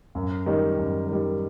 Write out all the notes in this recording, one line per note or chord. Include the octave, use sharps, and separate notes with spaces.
F#2
D#3 G3
F#2
D#3 G3